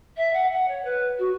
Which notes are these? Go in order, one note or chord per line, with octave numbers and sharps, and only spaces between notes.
E5
F#5
F#5
C#5
B4
F#4